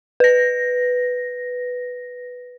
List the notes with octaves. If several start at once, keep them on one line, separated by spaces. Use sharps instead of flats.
B4 A#6